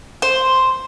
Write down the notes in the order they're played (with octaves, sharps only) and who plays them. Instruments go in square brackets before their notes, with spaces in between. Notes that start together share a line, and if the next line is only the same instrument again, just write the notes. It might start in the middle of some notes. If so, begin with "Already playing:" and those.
[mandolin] C5